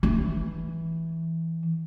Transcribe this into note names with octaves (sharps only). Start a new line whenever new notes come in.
E3